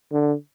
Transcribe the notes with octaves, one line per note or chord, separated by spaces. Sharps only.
D3